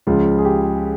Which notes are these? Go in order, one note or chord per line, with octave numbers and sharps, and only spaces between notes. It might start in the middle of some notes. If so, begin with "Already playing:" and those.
C#2 C#3 F3 F4
G#4
G4